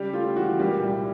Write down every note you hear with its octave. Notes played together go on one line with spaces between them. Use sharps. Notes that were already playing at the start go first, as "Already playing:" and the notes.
Already playing: C#3 G3 G4
A3 F4
E3 F#4
A#2 G3 G4
C2